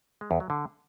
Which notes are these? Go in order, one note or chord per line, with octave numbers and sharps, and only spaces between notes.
G#3
E2
F#3
D3